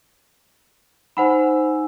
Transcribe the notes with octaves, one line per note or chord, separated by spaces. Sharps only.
D#4 C5 F#5 G#5 B5 E6